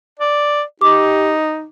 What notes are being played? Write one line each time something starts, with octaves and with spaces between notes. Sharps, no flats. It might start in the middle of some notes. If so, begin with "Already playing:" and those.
D5
D#4 G4 D6